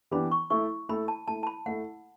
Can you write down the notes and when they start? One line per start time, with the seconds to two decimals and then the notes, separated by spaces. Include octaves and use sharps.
0.11 E3 B3 D4 G4 B5
0.31 C#6
0.50 A3 E4 A4 C#6
0.89 A3 E4 A4 B5
1.08 A5
1.28 A3 E4 A4 A5
1.43 A5
1.47 B5
1.66 A3 E4 A4 F#5